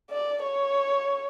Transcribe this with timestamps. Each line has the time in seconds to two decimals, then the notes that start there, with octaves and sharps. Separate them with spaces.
0.10 D5
0.42 C#5